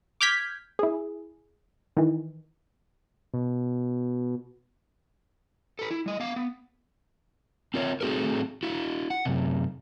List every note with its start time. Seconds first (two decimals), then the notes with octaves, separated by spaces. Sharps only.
0.21 D6 F6 G6 G#6 B6
0.79 E4 G#4
1.97 D#3 E3
3.34 B2
5.79 A4 B4
5.91 E4
6.06 G3 D#5
6.20 B3 F5
6.36 B3
7.74 C4 F4 A#4 C#5
8.01 A3 C4 F#4 G#4 A#4
8.63 E4 F#4
9.10 F#5
9.25 F#2 C3